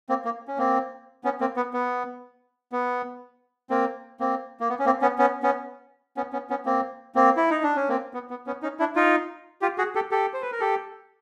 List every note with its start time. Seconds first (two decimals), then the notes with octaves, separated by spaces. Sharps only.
0.09 A#3 C4
0.25 A#3
0.48 C#4
0.58 A#3 C4
1.24 B3 C#4
1.41 A#3 C4
1.56 B3
1.73 B3
2.72 B3
3.70 A#3 C4
4.20 A#3 C4
4.60 A#3
4.69 B3
4.79 C#4
4.85 A#3 C4
5.01 B3 C#4
5.18 B3 C#4
5.43 B3 C#4
6.17 B3 C#4
6.33 B3 C#4
6.50 B3 C#4
6.66 A#3 C4
7.15 A#3 C4
7.37 E4
7.50 D#4
7.63 D4
7.76 C#4
7.89 A#3 C4
8.14 B3
8.30 B3
8.47 B3 C#4
8.63 C#4 D#4
8.79 D4 E4
8.95 D#4 F4
9.62 F4 G4
9.78 F#4 G#4
9.95 G4 A4
10.11 G4 A4
10.33 C5
10.42 B4
10.52 A#4
10.60 G4 A4